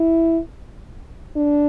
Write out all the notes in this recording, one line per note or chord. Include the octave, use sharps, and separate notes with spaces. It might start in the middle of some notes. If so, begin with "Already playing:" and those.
Already playing: E4
D4